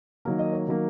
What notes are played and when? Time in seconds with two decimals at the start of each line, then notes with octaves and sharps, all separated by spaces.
0.25 D#3 F#3 A#3 A#4
0.39 D#5
0.52 C#5
0.67 D#3 F#3 A#3